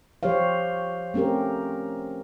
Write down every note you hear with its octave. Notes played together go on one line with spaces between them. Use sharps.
F3 G4 C5 C#5 F5
A3 C4 C#4 G4 A#4